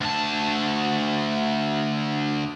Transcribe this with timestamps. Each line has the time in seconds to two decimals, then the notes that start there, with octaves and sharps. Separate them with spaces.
0.01 D2 A5